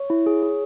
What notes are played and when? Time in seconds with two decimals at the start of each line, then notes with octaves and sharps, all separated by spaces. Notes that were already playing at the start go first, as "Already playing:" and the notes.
Already playing: C#5
0.10 E4
0.26 G#4
0.43 G#4